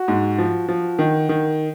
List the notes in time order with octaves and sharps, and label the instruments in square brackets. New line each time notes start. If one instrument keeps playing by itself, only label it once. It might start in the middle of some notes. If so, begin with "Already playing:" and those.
Already playing: [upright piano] F#4
G#2
F3
F3
D#3
D#3